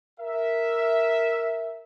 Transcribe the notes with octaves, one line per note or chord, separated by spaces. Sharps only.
A#4 E5